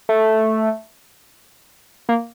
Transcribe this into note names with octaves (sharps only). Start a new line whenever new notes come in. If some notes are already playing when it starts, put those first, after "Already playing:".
A3
A#3